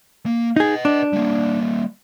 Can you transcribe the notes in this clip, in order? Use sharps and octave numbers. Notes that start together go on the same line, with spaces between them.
A#3
D#4 G#4 B4 D#5
D4
G3 A#3